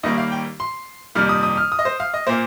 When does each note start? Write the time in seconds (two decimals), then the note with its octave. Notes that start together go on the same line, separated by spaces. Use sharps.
0.03 D#2 D#3 G3 A#3 D#5
0.18 F5
0.32 G5
0.60 C6
1.15 F2 C3 D#3 G3 A#3 F6
1.29 D#6
1.43 D#6
1.57 F6
1.72 D#6
1.79 D#5
1.85 C5
2.00 F5
2.14 D#5
2.27 A#2 A#3 C5